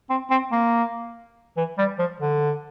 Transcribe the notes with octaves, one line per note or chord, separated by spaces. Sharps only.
C4
C4
A#3
E3
G3
F3
D3